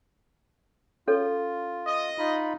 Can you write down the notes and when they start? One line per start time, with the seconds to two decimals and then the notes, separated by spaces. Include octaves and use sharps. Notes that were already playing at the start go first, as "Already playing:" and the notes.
1.08 C#4 F4 A4 C#5
1.87 D#5
2.18 D#4 F4 B5